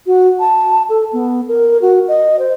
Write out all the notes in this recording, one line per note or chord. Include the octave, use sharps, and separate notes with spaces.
F#4
A5
A4
B3
A#4
F#4
D#5
C5